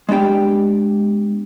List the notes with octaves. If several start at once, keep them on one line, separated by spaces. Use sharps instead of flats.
G#3 B3 D4 G4 G5